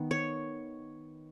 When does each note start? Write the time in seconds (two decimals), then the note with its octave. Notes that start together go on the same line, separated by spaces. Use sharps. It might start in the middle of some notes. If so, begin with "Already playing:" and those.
Already playing: D#3 B3
0.11 C#5